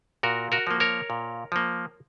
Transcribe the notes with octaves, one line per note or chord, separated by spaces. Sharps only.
A#2 F#4 A#4
F#4 A#4
F3 A#3
A#4 C#5
A#2
F3 A#3